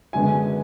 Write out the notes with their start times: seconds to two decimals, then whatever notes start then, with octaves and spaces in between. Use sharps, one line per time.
0.13 F#2 D3 G#3 B3 G#5